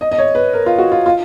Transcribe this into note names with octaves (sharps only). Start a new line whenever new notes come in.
D#5
D#5
C#5
B4
A#4
F4
F#4
F4
F4